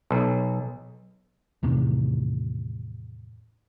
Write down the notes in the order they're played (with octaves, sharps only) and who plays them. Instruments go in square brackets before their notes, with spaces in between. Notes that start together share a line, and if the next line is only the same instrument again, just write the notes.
[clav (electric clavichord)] B1
[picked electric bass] E2 A2 C3 D#3